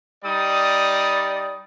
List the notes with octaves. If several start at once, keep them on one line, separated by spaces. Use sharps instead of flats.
G3 D#4 D5 D#6